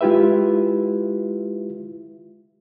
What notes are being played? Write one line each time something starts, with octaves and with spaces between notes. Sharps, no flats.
G#3 E4 F4 G4 B4 E5